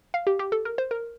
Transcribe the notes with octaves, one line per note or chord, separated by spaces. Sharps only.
F5
G4
G4
A4
A#4
C5
A#4